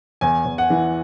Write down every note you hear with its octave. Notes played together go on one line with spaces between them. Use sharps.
E2 G#5
E2
F#5
E3